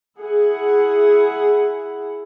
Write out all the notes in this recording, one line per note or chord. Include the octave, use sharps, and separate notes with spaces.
E4 G#4 F#5